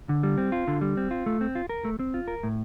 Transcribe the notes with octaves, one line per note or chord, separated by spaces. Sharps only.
D3
G3
C4
F4
D3
G3
C4
F4
A3
C4
F4
A#4
A3
C4
F4
A#4
A2